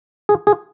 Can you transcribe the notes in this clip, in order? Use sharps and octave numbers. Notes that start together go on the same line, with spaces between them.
G#4
G#4